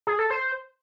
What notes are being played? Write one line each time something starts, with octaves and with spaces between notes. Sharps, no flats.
G#4
A4
C5